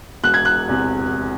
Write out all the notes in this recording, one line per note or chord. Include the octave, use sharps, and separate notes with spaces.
E1 F#6
G#6
F#6
E2 C3